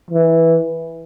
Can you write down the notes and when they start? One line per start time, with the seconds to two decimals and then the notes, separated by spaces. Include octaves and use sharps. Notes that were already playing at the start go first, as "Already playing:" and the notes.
0.11 E3